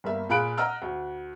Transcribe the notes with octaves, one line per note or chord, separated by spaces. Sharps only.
G1 A#3 E5
A#2 G#4 F5 B5 F#6 D7
D#5 F#5 A#5 E6 F6
D2